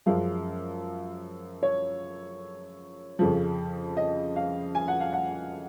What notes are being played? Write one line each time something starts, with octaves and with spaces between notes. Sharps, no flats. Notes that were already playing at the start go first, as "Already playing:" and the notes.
F#2 F3 G#3 F5
C#5
F2 C#3 F3
D#5
F5
G#5
F#5
F5
F#5